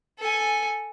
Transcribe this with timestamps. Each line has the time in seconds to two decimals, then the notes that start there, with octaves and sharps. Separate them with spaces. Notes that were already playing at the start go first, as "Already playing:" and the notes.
0.19 A4 G#5